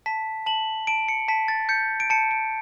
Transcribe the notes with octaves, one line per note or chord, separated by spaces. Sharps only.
A5 B6
A5 F#7
A5 D7
C#7
A5 B6
A6
G6 C#7
D7
A5 C#7
D7